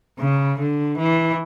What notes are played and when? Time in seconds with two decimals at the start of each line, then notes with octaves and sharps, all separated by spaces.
0.19 C#3
0.59 D3
0.98 E3